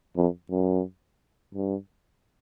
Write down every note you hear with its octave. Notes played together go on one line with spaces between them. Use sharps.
F2
F#2
G2